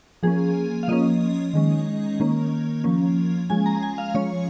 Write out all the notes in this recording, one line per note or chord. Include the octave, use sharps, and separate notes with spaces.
F3 A#3 C#4 G#4
F5
F3 A#3 C#4 D#5
D#3 G#3 C#4
D#3 A#3 C#4
F3 A#3 C#4
F3 G#3 C#4 G#5
A#5
G#5
F5
F3 G#3 C#4 C#5